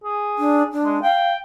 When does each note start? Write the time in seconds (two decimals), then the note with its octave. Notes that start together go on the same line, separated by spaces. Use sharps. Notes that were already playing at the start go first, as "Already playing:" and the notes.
0.04 G#4
0.38 D4
0.73 D4
0.84 G#3
1.03 F5 G5